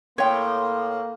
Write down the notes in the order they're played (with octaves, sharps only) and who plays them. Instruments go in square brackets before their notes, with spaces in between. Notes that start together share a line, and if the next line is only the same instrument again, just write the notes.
[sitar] A2 [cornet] A#3 [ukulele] C#5 G5 [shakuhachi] C6